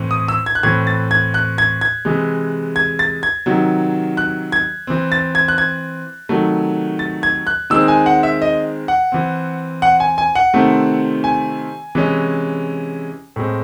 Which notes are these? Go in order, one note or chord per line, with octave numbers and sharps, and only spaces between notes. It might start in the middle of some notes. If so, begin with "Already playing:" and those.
Already playing: A2 E3 C4
D#6
E6
G#6
F#6
A2 E3 C4 G#6
A6
G#6
F#6
G#6
G#6
C3 E3 G#3
G#6
A6
G#6
C3 D#3 F#3
F#6
G#6
E3 C4
A6
G#6
F#6
G#6
C3 D#3 F#3 A3
A6
G#6
F#6
D#3 G#3 C4 E6
G#5
F#5
E5
D#5
F#5
E3 C4
F#5
G#5
G#5
F#5
C3 D#3 A3 C4
G#5
C3 E3 G#3 C#4
A2 G#3 C4